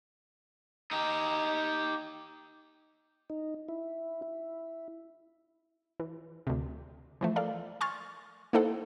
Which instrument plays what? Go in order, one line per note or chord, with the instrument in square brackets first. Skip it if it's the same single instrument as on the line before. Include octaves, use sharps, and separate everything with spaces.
[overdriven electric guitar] D#4 G4
[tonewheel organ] D#4
E4
E4
[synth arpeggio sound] E3
D2 C3
E3 F3 A3
A4 A#4 D5 F5
G#5 C6 C#6 F6 A6
A#3 D#4 E4 A4 C5 F#5